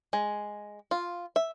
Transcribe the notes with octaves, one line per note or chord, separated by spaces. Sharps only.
G#3
F4
E5